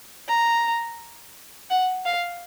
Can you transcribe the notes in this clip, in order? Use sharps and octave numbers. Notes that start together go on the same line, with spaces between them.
A#5
F#5
F5